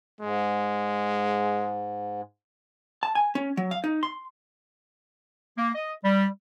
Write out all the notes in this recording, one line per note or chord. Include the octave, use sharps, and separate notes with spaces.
G#2 G#3
A5
G#5
C#4
F#3
F5
D#4
C6
A#3
D#5
G3